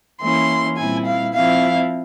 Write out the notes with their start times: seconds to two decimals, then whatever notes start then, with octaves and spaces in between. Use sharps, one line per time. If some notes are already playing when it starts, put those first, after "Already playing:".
0.20 E3 A#3 C#4 E4 C6
0.77 A#2 G3 C4 E4 G#5
1.06 F5
1.35 F3 C4 E4 F5